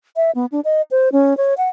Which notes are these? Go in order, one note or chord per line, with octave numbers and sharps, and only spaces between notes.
E5
B3
D4
D#5
C5
C#4
C#5
F#5